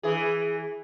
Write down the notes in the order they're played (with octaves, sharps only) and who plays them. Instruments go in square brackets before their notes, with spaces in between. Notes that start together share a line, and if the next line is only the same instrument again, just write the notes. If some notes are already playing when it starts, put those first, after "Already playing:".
[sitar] E3 G#4